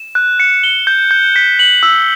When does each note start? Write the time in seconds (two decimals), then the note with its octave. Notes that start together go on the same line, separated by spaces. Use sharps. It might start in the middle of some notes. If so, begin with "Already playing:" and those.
Already playing: E7
0.15 F#6
0.40 C#7
0.64 G7
0.87 G6
1.11 G6
1.36 B6
1.59 F#7
1.83 E6